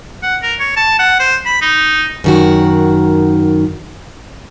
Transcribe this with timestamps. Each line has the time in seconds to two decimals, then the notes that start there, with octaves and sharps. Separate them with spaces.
0.23 F#5
0.43 A#4
0.60 C#5
0.77 A5
0.99 F#5
1.19 C5
1.46 B5
1.61 D#4
2.24 F#2 D#3 F#4